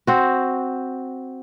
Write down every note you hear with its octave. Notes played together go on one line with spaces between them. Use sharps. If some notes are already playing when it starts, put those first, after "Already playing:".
C4 F#4